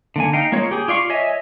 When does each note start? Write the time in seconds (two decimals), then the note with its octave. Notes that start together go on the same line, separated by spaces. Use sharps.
0.16 D3 A#3 G#5
0.33 D#4 F5 G5
0.52 G#3 A#3 F4 C#5
0.71 G4 G#4
0.88 F4 D5 F5 C#6
1.10 C#5 D#5 E5 G#5